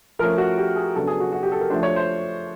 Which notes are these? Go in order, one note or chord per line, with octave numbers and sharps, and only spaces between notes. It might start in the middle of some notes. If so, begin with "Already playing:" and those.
F3 A3 C#4 A#4
F#4
G4
G#4
C#3 F#3 B3 D4 A4
G#4
F#4
F#4
G4
A4
A#4
F3 A3 D4 C5
C#5
C5